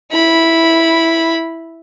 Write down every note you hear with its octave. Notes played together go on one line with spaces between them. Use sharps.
E4 B5